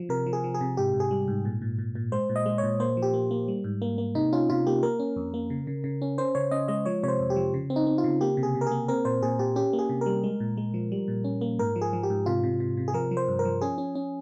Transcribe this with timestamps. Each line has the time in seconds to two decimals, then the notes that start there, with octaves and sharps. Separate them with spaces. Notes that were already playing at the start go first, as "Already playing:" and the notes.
Already playing: F3
0.09 C3 A#4
0.26 F3
0.33 G#4
0.44 F3
0.54 G#4
0.61 C3
0.77 G#2 G4
0.94 G#2
1.00 G#4
1.11 G3
1.28 G#2
1.45 A#2
1.62 A#2
1.78 A#2
1.95 A#2
2.12 G#3 C5
2.29 A#2
2.36 D#5
2.46 G#3
2.58 C#5
2.63 A#2
2.80 A#3 C5
2.97 F3
3.02 G4
3.14 A#3
3.31 A#3
3.48 G3
3.64 G#2
3.82 A#3
3.98 A#3
4.15 C3 D#4
4.32 C#4 F4
4.50 C3 F4
4.67 A#3 G4
4.83 A#3 A#4
4.99 C#4
5.16 F2
5.34 A#3
5.50 C#3
5.67 C#3
5.84 C#3
6.02 C#4
6.18 C#4 C5
6.35 C#3 C#5
6.51 C#4 D#5
6.68 G#3 D#5
6.86 F3 C#5
7.03 C3 C#5
7.08 C5
7.20 F2
7.30 G4
7.36 F3
7.54 C#3
7.70 C4
7.76 D#4
7.87 C4
7.98 F4
8.04 C#3
8.21 A#3 G4
8.37 C3
8.43 G#4
8.55 C3
8.61 A#4
8.67 A#3 G#4
8.88 C4 A#4
9.05 A#2 C5
9.23 A#2 G#4
9.39 A#2 G4
9.56 C#4 G4
9.73 A#3
9.79 G#4
9.89 C3
10.01 G3 A#4
10.24 G#3
10.40 A#2
10.57 G#3
10.74 F3
10.92 G3
11.08 A#2
11.24 C#4
11.41 A#3
11.59 G#2 A#4
11.76 F3
11.81 G#4
11.93 F3
12.03 G4
12.10 G#2
12.26 C3 F4
12.43 C3
12.60 C3
12.77 C3
12.88 G#4
12.94 F3 A#4
13.11 F3
13.17 C5
13.28 G2
13.39 A#4
13.45 F3
13.61 C#4 G#4
13.78 C#4
13.95 C#4